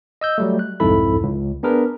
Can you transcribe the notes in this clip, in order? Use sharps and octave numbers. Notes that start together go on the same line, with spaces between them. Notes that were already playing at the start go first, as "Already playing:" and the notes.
D#5 E6 G6
F#3 G3 A3
F#6
C2 F2 G#2 E4 A4 B5
C#2
B3 D4 G#4 A#4 B4